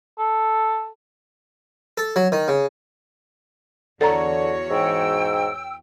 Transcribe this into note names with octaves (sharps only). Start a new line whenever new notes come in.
A4
A4
F#3
D#3
C#3
E2 D3 F#4 A4 C#5 A#5
G#2 G5 E6